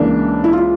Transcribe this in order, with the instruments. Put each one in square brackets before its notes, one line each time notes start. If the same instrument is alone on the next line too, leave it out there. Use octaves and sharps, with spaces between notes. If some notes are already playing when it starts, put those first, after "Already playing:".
Already playing: [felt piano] C#2 C#3 E3 A#3 D4
E4
F4